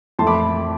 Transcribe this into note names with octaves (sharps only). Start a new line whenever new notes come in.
F2 E3 A3 A5 C6
B5 D6